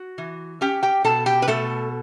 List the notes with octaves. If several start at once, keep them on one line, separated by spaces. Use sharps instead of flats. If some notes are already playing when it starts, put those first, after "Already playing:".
Already playing: F#4
E3
C#4 G4 G5
G4 G5
B2 A4 A5
G4 G5
B4
B2 A3 A4